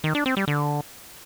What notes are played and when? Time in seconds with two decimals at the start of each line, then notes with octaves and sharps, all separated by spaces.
0.04 D#3
0.15 D4
0.26 C4
0.37 G3
0.48 D3